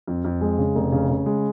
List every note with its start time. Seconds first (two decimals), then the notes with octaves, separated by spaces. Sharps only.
0.07 F2
0.24 F2
0.41 G#3
0.58 C#3
0.75 F1
0.92 C#3
1.09 C#3
1.26 G#3